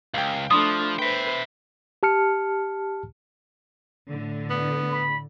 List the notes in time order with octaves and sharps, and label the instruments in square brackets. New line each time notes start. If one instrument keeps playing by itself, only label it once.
[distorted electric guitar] C#2 [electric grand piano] F5 G5
[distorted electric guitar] F3 [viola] A3 D4 [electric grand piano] B5 C6 [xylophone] D#6
[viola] B4 C5 [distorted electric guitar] E5 G5
[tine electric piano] G4 A5 F6 C#7
[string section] A2 D3
[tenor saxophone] B3
[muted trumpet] B5